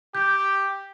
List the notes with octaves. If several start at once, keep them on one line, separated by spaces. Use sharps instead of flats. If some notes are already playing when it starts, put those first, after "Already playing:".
G4 G6